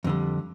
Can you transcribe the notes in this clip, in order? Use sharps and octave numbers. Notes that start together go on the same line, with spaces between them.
F2 D3 G3